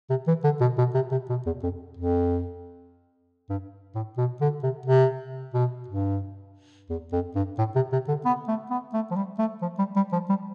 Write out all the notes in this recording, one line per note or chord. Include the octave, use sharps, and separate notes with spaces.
C3
E3
D3
B2
B2
C3
C3
B2
E2
F2
F2
G2
A2
B2
D3
C3
C3
B2
G2
E2
F2
G2
A2
C3
C3
D3
B3
A3
B3
A3
F3
G3
A3
F3
G3
G3
F3
G3